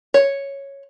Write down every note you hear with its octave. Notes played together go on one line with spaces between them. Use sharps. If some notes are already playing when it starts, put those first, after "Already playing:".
C#5